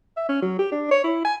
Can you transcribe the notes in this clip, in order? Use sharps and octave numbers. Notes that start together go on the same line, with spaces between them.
E5
C#4
F#3
G4
D4
C#5
E4
G#5